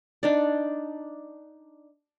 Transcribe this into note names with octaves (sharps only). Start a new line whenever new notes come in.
D4 D#4 D5